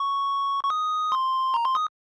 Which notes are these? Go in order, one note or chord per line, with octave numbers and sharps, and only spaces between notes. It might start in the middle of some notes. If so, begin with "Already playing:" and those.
Already playing: C#6
C#6
D#6
C6
A#5
C6
D#6